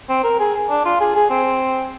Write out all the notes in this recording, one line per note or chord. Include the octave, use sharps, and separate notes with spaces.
C4
A#4
G#4
D4
F4
G#4
G#4
C4